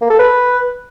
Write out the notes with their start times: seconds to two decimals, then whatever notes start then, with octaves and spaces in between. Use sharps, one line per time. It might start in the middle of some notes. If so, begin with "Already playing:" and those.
0.02 A#3
0.10 A4
0.19 B4